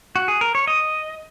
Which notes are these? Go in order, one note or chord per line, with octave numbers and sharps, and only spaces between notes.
F#4
G#4
A#4
C#5
D#5